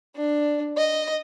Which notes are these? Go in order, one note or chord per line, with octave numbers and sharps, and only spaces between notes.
D4
D#5